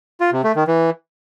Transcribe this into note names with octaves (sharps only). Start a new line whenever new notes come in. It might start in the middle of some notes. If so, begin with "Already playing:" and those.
F4
C3
A3
D#3
E3